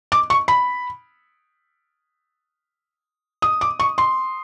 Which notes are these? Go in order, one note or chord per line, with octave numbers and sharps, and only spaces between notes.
D6
C#6
B5
D#6
D6
C#6
C6